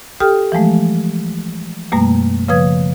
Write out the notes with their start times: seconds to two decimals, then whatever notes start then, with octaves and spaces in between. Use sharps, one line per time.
0.20 G4 A4 G5 D#6 F6
0.52 E3 F3 G#3 A3
1.92 F#2 B2 G3 A3 A#3
2.48 C#3 F3 B4 D#6 G#6